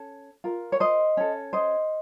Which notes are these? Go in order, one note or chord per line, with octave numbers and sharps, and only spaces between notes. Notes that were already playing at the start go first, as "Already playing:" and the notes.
Already playing: C#4 A4
F4 A#4
C#5
C5 D#5
C#4 A4
C5 D#5